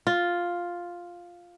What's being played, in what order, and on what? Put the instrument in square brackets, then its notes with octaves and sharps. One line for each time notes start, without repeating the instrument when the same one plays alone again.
[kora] F4